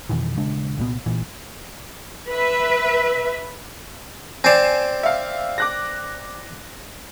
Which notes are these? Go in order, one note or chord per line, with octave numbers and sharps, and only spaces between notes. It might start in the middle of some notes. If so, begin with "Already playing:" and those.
F2 B2 D#3 E3
D#1 C#3 G#3 D4
C2 A#2 B3
A#1 A#2 E3
B4 E5
C4 D5 G#5 C7 E7
E5 F5
D6 F#6 A#6